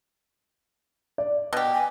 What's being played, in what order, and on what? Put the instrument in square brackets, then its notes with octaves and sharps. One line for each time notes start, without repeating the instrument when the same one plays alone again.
[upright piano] D5
[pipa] B2 G4
[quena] G#5